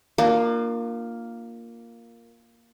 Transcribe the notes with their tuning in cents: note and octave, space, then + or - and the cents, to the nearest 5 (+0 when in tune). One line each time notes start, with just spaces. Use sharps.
A#3 +0 D4 +40 F4 +0